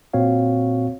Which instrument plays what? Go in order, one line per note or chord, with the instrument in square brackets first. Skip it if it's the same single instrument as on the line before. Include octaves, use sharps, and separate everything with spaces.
[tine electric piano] A#2 C4 F#4 C#5 F5